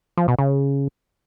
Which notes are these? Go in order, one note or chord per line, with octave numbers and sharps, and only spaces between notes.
F3
B2
C#3